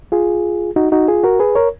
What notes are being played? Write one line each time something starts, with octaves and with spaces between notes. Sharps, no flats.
F4 G#4
D#4 F#4
D#4 F#4
F4 G#4
F#4 A#4
G#4 B4
A#4 C#5